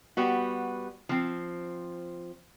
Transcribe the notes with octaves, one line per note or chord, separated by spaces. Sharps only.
G3 B3 F#4
F3 C4